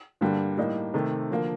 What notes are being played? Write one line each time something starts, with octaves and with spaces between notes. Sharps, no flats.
G2 D3 G3 A#3
A2 G3 A#3 D#4
C3 D#3 A3
D3 F3 A#3 F4